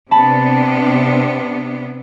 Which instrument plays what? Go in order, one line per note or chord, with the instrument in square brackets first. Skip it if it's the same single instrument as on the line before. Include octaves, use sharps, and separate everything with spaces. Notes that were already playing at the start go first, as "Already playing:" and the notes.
[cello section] C3 B3 D4 [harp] A5 B5